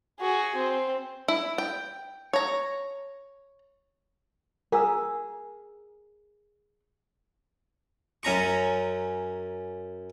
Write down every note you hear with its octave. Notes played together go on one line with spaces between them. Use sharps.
F#4 G#4
C4
E4
G5
C#5 A#5
G#4 A#4 E6
F#2 C#4 A#5 C#6